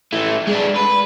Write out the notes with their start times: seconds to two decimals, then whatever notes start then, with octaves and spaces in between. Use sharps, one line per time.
0.13 E3 A3
0.47 G#3 D4
0.76 B4